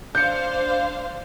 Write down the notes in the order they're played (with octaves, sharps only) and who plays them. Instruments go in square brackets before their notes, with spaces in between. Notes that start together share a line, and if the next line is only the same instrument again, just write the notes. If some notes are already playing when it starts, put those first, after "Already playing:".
[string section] D4 C5 F5 [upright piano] G6 C#7